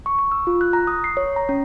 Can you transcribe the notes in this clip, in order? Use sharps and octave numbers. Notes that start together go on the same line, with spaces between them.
C#6
C#6
E6
F4
F#6
A#5
D#6
C7
C#5
A#5
C#4